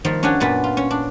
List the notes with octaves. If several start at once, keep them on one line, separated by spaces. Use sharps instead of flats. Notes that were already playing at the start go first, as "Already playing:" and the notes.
D#3 F3 G3 A#3
C#4 D4 G4 F#5 G#5
F#2 A#2 B3 B4 A5
F4
C#4
D4